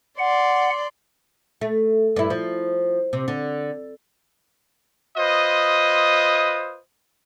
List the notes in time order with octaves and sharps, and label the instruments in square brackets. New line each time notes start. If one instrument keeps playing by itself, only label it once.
[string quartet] D5 C6 [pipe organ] F#5
[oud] A3
G2 E4
F3
C3
D3
[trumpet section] F4 B4 C5 D#5 D#6